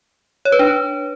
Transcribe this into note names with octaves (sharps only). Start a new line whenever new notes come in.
C#5
B4
D4